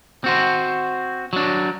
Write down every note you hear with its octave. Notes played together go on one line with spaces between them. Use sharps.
C4 F#4 C5
F#3 D4